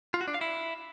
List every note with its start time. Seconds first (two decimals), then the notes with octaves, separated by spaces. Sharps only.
0.14 F4
0.21 F#4
0.28 D4
0.34 F5
0.41 E4